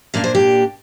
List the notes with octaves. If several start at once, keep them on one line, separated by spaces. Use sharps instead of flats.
A#2 A#3 D4 F5
C5
G4